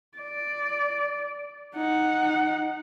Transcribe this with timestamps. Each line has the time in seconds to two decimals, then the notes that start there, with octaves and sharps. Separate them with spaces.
0.18 D5
1.75 D#4 F#5